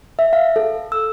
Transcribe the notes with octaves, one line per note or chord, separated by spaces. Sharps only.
E5
F5
A4
E6